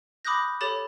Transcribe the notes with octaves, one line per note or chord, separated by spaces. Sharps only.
B5 D6 D#6 F#6 G6 A#6
G4 A4 C#5 B5 A6 E7